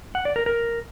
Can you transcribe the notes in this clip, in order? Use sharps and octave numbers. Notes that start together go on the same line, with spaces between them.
F#5
D5
A#4
A#4